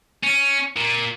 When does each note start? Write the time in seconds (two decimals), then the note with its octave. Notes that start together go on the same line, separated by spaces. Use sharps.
0.24 C#4
0.77 A#2